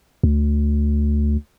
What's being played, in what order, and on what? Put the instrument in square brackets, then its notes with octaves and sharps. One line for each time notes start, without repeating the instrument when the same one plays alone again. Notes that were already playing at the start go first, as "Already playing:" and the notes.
[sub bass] D2